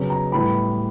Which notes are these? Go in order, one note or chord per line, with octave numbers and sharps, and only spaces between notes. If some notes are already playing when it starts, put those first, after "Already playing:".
Already playing: C#3 F#3 B3
A#5
A2 E3 G3 B3 B5